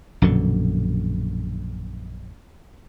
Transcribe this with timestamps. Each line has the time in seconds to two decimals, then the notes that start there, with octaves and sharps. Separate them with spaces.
0.22 A#1 F#2 B2 D3